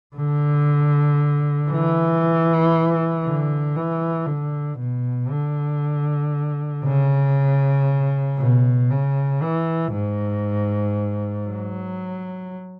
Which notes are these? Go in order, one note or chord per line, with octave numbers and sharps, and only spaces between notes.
D3
E3
D3
E3
D3
B2
D3
C#3
B2
C#3
E3
G#2
F#3